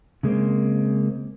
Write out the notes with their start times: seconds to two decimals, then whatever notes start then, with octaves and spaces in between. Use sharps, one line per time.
0.23 C#3 G#3 A#3 C4